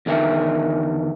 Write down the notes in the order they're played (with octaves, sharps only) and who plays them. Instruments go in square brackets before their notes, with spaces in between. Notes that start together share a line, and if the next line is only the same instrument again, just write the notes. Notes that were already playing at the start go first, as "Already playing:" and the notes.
[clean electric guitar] E2 D3 D#3 E5 G5